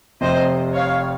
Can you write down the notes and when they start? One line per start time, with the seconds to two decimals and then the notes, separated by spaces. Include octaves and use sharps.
0.21 F1 F2 C3 C5 D#5
0.74 C#5 F5